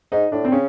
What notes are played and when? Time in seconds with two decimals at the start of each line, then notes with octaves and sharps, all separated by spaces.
0.12 G#2 D#4
0.32 A2 D4
0.45 C4
0.52 C#3 C#4